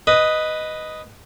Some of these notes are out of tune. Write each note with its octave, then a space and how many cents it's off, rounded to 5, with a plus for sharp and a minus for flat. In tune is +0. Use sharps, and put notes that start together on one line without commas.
B4 +0 D#5 +0